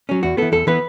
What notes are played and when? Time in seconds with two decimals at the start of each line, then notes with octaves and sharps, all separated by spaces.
0.09 F#3 C#4
0.23 E2 F#4
0.37 E3 B3 A4
0.52 E2 A4
0.67 E3 B3 B4